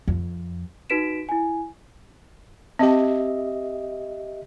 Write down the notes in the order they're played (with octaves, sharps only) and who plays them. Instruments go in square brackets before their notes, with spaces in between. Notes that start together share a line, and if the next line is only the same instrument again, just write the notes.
[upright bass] F2
[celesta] D#4 F#4 B4 B6 D7 E7
E4 G#5
[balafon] C4 A5 [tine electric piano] G4 D#5 E5